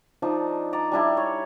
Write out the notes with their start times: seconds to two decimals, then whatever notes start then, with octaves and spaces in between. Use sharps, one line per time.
0.22 F3 D4 D#4
0.73 D5 D#5 A#5 D6
0.92 G3 D4 E4
1.17 C#5